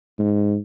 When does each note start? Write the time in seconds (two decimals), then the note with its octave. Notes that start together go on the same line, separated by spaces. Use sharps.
0.19 G#2